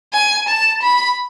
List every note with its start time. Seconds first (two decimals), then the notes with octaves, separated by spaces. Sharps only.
0.13 G#5
0.48 A5
0.82 B5